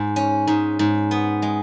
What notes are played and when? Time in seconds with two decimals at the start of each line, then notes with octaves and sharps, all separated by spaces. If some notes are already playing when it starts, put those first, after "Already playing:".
Already playing: G#2
0.16 C#4
0.47 G#2
0.79 G#2
1.11 B3
1.42 G#3